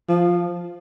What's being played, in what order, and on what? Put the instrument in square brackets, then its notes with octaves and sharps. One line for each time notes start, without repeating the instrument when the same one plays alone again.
[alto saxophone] F3